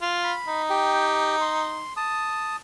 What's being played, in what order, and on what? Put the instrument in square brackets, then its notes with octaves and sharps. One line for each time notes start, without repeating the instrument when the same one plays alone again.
[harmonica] F4
[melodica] B5
[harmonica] D#4
[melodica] G4 G5
C6
A5 D#6